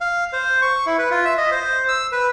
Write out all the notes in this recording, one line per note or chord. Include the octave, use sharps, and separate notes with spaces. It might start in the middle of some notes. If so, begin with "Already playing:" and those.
F5
C5
C#6
E4
B4
F4
E5
D#5
C5
E6
B4